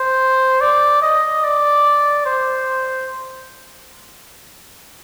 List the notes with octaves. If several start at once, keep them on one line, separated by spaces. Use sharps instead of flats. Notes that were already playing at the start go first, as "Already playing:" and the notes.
Already playing: C5
D5
D#5
D5
C5